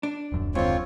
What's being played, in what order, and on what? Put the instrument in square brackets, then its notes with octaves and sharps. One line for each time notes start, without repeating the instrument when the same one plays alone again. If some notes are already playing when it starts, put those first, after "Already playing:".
[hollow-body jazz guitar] D4
[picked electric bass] D#1 F#2
[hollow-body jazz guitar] G#2 D3 [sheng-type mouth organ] C4 F4 C#5